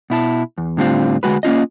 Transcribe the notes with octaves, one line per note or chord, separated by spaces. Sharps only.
B2 E4 A5
E2
A2 D3 G3 C4 F4
D2 G2 G#3 F#4 B4
A#3 C#4 F4 D#5